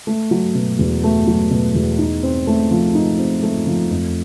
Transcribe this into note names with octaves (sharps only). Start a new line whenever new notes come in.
A3
F#3
B2
E2
A3
F#3
B2
E2
D#4
C4
A3
F3
D#4
C4
A3
F3
F2